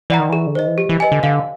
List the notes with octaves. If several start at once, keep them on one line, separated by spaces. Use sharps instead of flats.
E3 D5 F#5 A#5
D#3
E3 G#4
D3
D#3 C5 D#5
E3
F3 G4
E3
B4 D#5 G#5
D3
D3 F5